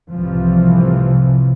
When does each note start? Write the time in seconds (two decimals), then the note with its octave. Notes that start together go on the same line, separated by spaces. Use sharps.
0.12 C2 A2 C3 E3 F3